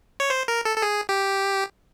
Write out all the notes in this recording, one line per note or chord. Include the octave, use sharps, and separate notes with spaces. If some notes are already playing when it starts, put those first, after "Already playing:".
C#5
C5
A#4
A4
A4
G#4
G4